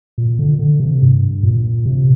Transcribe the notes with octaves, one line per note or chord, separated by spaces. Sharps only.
A#2
D3
D3
C3
G2
A#2
C3